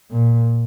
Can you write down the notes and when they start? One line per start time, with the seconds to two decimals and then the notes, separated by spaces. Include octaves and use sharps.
0.11 A#2